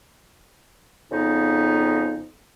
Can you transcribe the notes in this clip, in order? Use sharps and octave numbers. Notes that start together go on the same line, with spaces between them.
F2 C#3 B3 D#4